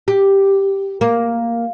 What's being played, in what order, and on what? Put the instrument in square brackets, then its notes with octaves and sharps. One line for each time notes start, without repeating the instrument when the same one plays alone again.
[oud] G4
A#3